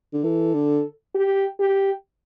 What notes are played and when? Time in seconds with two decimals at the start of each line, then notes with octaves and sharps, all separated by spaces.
0.13 D3
0.24 E3 A4
0.54 D3
1.15 G4
1.60 G4